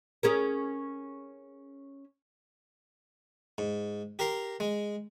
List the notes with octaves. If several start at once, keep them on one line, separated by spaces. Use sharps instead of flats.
C#4 G#4 A#4
G#2
G4 A#4 A#5 C6
G#3